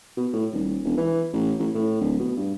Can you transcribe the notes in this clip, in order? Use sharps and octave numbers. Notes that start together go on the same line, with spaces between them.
B2
A2
D#1
E1
E3
A1
A1
A2
D1
B2
G2